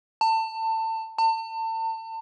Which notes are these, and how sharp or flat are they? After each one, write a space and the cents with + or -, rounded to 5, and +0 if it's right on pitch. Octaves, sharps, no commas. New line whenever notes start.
A5 +25
A5 +35